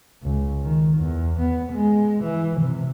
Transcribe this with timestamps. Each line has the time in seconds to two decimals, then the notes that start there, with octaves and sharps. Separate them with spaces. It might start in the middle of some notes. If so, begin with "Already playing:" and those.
0.23 C#2
0.63 D#3
0.98 E2
1.39 B3
1.72 G#3
2.23 E3
2.60 C3